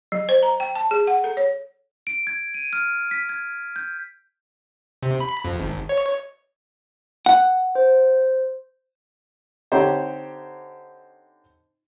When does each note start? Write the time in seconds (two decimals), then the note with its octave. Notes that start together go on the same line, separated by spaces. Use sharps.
0.12 F#3
0.29 C5
0.43 A#5
0.60 G5
0.75 A5
0.91 G#4
1.07 F#5
1.24 A4
1.37 C#5
2.07 D7
2.27 G#6
2.54 D#7
2.73 F6
3.11 B6
3.29 G#6
3.76 G6
5.03 C3
5.20 B5
5.45 F2
5.60 G#1
5.89 C#5
7.26 F#5
7.75 C5
9.72 D3 C4 D#4 G4 C5 C#5